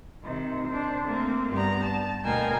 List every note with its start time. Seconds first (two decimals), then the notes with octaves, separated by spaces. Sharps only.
0.24 C3 D#3
0.67 D4 C5
1.05 A3 A#3 C4
1.51 G2 B3 G4 D5 A#5
1.83 A5
2.23 D2 B2 A#4 F5 G5 G#5